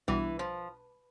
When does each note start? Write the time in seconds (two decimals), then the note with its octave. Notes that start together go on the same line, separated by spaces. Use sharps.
0.08 B1 B2 E3 G3 D4
0.39 F3